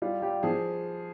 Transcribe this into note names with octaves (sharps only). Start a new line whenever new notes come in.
G3 F4
G3 G4
F3 G#4